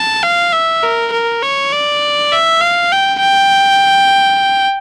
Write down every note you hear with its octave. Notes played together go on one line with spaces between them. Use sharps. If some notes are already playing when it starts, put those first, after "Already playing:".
Already playing: A5
F5
E5
A#4
A#4
C#5
D5
E5
F5
G5
G5